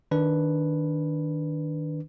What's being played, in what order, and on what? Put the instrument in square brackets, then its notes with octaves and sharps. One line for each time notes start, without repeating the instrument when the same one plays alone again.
[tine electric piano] D#3 D4 B4